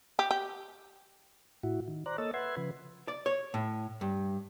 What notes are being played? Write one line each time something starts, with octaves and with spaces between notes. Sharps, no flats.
G4
G4
A2 E4 F#4
D#3
C5 D5 A#5 F#6
A#3 A4 C#5 D#5 E6 A6
B4 E5 F#5 C6 G#6
C#3 F3 B4
D5
C#5
A2
G2